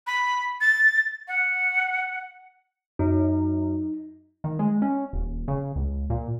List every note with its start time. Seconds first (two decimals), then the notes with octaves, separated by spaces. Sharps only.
0.07 B5
0.61 A6
1.28 F#5
2.99 F#2 D#4
4.44 D#3
4.59 G#3
4.82 C#4
5.13 D#1
5.48 C#3
5.76 C#2
6.10 A#2